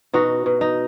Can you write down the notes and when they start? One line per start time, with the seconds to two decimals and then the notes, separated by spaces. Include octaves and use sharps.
0.14 B2 D#4 F#4
0.46 B2
0.61 D#4